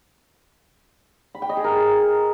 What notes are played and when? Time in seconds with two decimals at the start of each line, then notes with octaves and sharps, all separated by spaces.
1.35 B5
1.42 G5
1.49 D#5
1.57 G#4
1.64 A#4